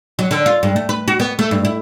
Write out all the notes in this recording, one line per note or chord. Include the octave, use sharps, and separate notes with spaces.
F#3
D3
F4
G2
A3
B4
F#4
B3
A3
G2
E4